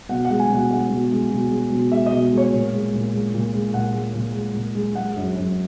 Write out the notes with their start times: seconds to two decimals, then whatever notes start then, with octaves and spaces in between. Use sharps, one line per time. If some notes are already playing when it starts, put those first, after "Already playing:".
0.09 B2 F#5
0.25 G#3 F#5
0.40 G#5
0.49 B2
0.55 F#5
0.71 G#3 F#5
0.90 B2
1.11 G#3
1.30 B2
1.51 G#3
1.72 B2
1.91 G#3 E5
2.06 D#5
2.12 B2
2.32 G#3
2.38 C#5
2.52 A#2
2.73 G#3
2.93 A#2
3.14 G#3
3.34 A#2
3.54 G#3
3.74 A#2 F#5
3.94 G#3
4.15 A#2
4.34 G#3
4.54 A#2
4.75 G#3
4.95 G#3 F#5
5.16 F#2
5.35 F#2